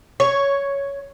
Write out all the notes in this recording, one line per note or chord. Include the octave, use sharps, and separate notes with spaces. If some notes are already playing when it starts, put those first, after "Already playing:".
C#5